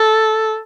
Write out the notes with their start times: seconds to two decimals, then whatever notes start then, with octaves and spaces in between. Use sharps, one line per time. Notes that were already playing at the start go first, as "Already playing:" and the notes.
Already playing: A4